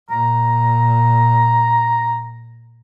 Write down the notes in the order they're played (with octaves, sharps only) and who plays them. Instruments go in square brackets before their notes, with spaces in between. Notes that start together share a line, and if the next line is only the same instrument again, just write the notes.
[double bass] A#2 [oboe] A#5